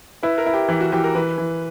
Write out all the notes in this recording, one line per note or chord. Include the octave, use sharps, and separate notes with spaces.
E4 B4
A#4
E4
G4
E3 E4
F#4
E3 G4
A#4
E3 B4
E3